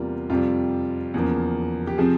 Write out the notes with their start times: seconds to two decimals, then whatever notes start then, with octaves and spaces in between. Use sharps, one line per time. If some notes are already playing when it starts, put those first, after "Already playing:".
Already playing: E2 C3 G3 A#3 F4
0.30 F2 C3 G3 F4
1.14 E2 C#3 F3 A#3
1.87 G4
1.98 C3 F3 C4 G#4